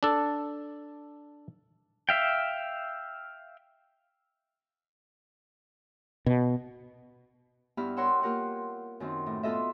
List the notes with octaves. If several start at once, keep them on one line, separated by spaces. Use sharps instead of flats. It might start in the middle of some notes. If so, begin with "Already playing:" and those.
D4 A4
E5 F5 G5
B2
G2 B3 E4 G4 B5 F6
A#4 C#5 F#5 G5 C6 E6
A#3 F4 G4 A#4 F#5
F#2 D#3 C4
A2
B3 F4 A4 D#5 E5